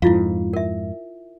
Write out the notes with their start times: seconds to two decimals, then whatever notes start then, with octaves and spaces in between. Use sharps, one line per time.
0.02 F2 G#2 E4 F4 F5
0.53 A#4 E5